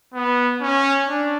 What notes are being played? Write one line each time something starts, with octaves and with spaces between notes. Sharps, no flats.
B3
C#4
D4